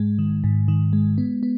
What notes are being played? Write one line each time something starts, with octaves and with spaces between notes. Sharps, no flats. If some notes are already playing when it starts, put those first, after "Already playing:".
Already playing: G#2 G#3
D#3
G#2
D#3
G#3
B3
B3